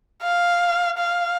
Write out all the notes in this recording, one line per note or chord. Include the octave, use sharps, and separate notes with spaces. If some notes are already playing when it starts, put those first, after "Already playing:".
F5
F5